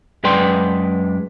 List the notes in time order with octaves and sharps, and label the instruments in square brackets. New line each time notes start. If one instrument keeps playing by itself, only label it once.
[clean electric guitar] F#2 G#3 B4 D5 G5 C6